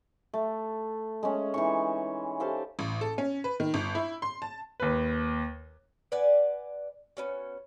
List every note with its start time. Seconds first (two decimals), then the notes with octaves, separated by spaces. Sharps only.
0.34 A3
1.23 G#3 C#4
1.54 E3 D#4 C#6
2.40 G4 A4 C5 F5
2.79 A1
3.01 A4
3.18 C#4
3.44 B4
3.60 D#3
3.74 G1
3.95 E4
4.22 C6
4.42 A5
4.80 D#2 B4
6.12 B4 D5 F#5 G#5
7.17 B3 C#4 F#4